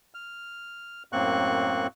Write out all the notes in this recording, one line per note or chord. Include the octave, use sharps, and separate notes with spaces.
F6
F#2 A2 A#3 C4 C#6 F#6